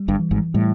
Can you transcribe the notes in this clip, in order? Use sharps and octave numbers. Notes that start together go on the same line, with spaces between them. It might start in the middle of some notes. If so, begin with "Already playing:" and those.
Already playing: G3
G1 G2
E3
G#1 G#2
A2 G3